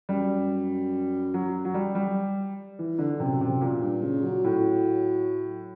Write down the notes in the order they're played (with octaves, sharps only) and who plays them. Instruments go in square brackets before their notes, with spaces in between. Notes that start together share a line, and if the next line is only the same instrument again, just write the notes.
[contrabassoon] F#2 [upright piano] G3
[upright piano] F#3
F#3
G3
G3
E3
D3
[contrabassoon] F#2 [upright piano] C3
[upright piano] C3
A#2
[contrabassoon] G2
C#3
F#3
[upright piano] A2